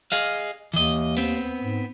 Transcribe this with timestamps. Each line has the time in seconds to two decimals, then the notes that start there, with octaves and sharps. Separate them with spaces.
0.12 G#4 D#5 F5
0.74 D#2 E3 D#5
1.17 B3 C4
1.61 G#2